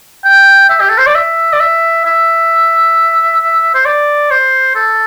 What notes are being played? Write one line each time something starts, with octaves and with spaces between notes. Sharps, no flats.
G5
E5
G4
A4
C5
D5
E5
D5
E5
E5
C5
D5
C5
A4